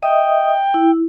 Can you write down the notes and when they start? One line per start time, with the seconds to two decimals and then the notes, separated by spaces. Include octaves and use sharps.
0.03 D#5 E5 G5 D#6
0.74 E4